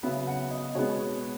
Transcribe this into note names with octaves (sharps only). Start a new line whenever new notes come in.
C#3 F#3 B3 E5
F#5
D#5
B2 G#3 B3 C#5